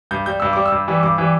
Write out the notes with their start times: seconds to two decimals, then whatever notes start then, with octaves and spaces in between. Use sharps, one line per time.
0.11 G2 G6
0.26 G3 G6
0.40 G2 E6
0.53 G3 D6
0.66 E6
0.72 G2
0.88 E3 G3
1.03 G2 D6
1.18 E3 G3